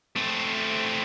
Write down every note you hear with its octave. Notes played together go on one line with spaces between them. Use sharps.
A3 C4